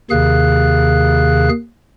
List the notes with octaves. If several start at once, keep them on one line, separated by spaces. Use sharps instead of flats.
D#2 C3 D#3 G#4 F5 F#6